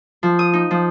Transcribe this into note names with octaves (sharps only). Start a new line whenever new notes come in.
F3
D#6
D#4
F3